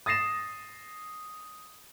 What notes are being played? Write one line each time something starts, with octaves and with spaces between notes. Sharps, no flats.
D#6 A6 A#6 C7 E7